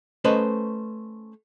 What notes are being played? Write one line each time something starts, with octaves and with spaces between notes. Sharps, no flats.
A3 C#4 B4 C5 D#5